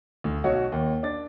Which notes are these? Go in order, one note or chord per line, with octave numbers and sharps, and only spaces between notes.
D2
B1 F#4 C#5
D#2
D4 A6